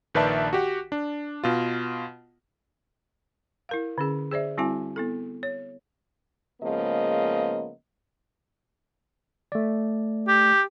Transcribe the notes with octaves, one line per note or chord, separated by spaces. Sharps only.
A#1 D#3 B4 D5 E5 A5
F#4 G4 F#5
D4
B2 F4
E4 A#4 F5
D3 C#4 G#4
G#4 C5 D5 E5
G3 C4 E4 F#4 G#5
B3 E4 A4
C#5
C#3 F3 G#3 A#3 B3 D#5
A3 D5
G4